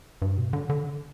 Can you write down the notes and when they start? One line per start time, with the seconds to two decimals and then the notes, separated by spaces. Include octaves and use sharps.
0.22 G2
0.37 B2
0.53 D3
0.69 D3